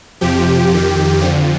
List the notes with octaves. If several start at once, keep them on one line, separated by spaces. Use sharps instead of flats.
F2 C3 F3 G4
F2 D#3
F2 D3 F3